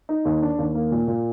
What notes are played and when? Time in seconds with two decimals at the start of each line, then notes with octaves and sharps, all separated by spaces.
0.09 D#4
0.25 D#2
0.42 D4
0.58 D#2
0.75 A#3
0.92 A#2
1.08 A#2